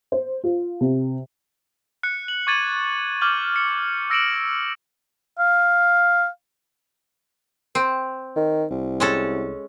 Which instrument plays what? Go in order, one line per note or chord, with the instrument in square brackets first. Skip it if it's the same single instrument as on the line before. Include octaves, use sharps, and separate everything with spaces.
[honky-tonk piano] C5
F4
C3
[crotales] F#6 C#7
F#7
C#6 D6 G#6 A6 D#7 F#7
D6 F6 G6 F#7
C#7
E6 A#6 C#7 D7 E7 F#7
[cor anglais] F5
[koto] C4
[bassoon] D#3
C2
[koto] G#3 C#4 A4